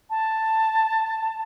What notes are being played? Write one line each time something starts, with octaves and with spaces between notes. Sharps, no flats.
A5